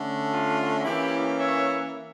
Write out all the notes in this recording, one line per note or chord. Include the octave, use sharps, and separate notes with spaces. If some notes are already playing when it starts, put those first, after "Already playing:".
Already playing: D3 A3 C#4
F4
E3 A#3 C#4 E4 G4
C#5 E5